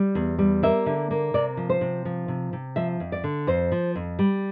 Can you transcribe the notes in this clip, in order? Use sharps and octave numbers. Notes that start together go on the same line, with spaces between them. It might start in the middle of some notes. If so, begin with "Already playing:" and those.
Already playing: G3
E2
G3
A#3 E5
D3
A#3
C3 D5
F3
C5
C3
F3
C3
C3
F3 E5
F2
D5
D3
F2 C5
F3
F2
G3